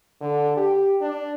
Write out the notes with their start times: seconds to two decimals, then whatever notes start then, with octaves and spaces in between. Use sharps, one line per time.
0.21 D3
0.57 G4
1.01 D4